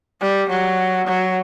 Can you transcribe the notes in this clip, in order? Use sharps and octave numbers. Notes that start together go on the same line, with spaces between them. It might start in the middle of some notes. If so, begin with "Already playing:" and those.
G3
F#3
F#3